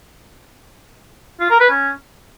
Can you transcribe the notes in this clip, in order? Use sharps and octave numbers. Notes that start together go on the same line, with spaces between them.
F4
A#4
B4
C#4